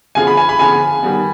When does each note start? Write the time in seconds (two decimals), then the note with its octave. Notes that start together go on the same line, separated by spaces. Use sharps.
0.15 D3 F3 B3 F4 G#4 G#5
0.27 B5
0.37 G#5
0.49 B5
0.59 D3 F3 B3 F4 G#4 G#5
1.02 D#3 G3 B3